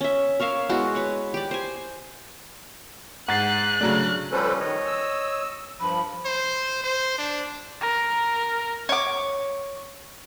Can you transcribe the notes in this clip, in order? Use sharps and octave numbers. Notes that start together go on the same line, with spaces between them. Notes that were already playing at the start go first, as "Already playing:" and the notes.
C#4 E5
A#4 C#5 E5 F5
G#3 B3 E4 F#4
B4 C#5 F#5
G4 D5
C5 G#5
G#2 F#5 F#6 A6 C7
C#3 F#3 A3 D4
F3 G3 C#4 A4 B4 C5
D#3 C#5 D#5
E6
G2 F3 B5
C5
C5
D4
A#4
C#5 D6